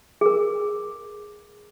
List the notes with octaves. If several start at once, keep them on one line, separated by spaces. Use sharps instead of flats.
G#4 A#4